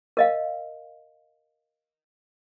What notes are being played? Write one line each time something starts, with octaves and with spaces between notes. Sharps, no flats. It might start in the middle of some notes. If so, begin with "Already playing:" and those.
A#4 D#5 F5